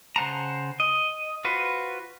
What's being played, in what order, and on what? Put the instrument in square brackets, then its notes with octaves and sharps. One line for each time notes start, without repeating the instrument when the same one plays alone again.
[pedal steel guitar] C#3 C5 F#5 A5 A#5
D#5
F4 F#4 B4 C5